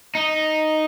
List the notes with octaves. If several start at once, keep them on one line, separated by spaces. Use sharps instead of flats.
D#4